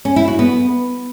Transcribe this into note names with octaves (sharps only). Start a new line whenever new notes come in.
C#4
E4
F#4
B3